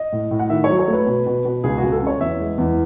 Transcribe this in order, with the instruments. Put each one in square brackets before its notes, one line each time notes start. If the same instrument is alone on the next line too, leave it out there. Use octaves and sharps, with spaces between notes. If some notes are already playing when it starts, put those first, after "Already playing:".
Already playing: [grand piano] D#5
A2
A2
F#5
D#3 E5
C#5
F#3
C#5
A3
B4
B2
B2
B2
C#2 G#4
C#2 F#4
A4
C#3 C#5
E2 E5
G#3
E2